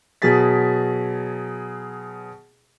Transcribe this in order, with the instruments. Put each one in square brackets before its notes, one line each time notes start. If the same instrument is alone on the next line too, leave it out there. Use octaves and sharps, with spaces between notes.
[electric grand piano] B2 F#3 G#4 G#5 A6 B6